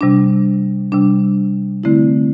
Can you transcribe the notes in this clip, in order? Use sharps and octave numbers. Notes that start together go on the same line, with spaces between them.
C3 G3 D4
C3 G3 D4
D3 A3 C4 E4